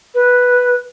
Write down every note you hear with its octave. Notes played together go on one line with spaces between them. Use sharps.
B4